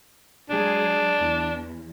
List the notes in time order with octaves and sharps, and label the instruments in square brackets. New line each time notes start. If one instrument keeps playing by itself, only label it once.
[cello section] F#3 G#3 G#4 [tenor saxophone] D4
[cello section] E2